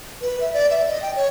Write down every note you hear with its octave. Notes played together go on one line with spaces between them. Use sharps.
B4
E5
D5
E5
D#5
G5
C#5